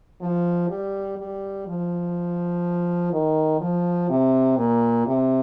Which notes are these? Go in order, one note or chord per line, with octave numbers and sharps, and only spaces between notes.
F3
G3
G3
F3
D#3
F3
C3
A#2
C3